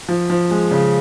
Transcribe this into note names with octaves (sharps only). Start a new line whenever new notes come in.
F3
F3
G#3
C#3